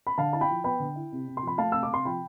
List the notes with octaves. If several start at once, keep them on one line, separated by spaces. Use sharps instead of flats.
B5
D3 F5 A5
E4 A5
G5 B5
F3
B3 G5 B5
D3
E4
C3
C3
C6
F3 B5
A3 F5 A5
C3 E6
D6
C3 C6
F3 G5 B5